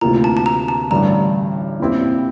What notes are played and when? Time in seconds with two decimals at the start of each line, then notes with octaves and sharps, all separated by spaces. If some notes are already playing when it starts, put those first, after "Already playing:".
0.01 D2 C3 E3 A#3 F4 A#5
0.24 A5
0.37 A5
0.46 A#5
0.68 A5
0.91 A1 G2 D3 G3 A#5
1.80 A#2 F3 C4 E4 G4